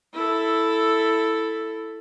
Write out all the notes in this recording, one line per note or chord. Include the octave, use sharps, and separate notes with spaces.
E4 A4